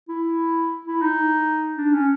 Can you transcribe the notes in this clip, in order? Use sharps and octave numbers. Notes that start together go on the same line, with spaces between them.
E4
E4
D#4
D4
C#4